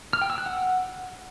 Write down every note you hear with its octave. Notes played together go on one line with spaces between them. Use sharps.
F6
G5
E6
F#6
F#5